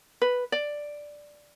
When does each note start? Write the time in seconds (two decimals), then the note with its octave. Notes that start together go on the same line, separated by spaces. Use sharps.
0.22 B4
0.52 D5